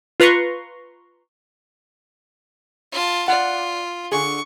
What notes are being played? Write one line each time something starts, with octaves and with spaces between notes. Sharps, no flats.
F4 B4 A#5 C6 C#6
F4 A5
F4 D5 F#5
D3 G#4 C#6